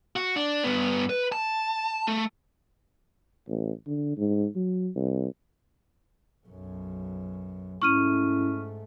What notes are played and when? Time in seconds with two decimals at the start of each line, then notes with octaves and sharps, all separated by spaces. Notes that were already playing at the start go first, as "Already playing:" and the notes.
0.16 F#4
0.36 D4
0.64 G2 B3
1.10 B4
1.32 A5
2.08 A3
3.48 A1
3.87 D3
4.17 G#2
4.55 F#3
4.96 C2
6.47 B1 F#2
7.82 G#2 A3 C#4 E4 C#6 F6 D#7